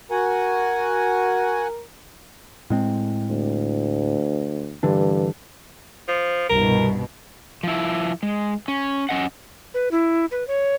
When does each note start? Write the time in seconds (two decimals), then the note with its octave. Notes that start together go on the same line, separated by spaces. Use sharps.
0.11 F#4 A#4 F#5 G#5
2.70 A2 G#3 C4
3.30 D2
4.83 G2 D3 E3 D4
6.08 F3
6.49 C2 G2 B2 A#4
7.63 F3 E4
8.23 G#3
8.68 C#4
9.09 F#3 C#4 D#5 F#5
9.74 B4
9.91 E4
10.31 B4
10.48 C#5